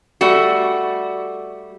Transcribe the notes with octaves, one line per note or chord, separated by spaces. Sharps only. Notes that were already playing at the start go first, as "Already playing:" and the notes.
G3 A3 F#4